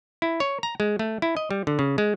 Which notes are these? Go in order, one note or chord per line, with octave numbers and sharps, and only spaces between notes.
E4
C#5
A#5
G#3
A3
E4
D#5
G3
D3
C#3
G#3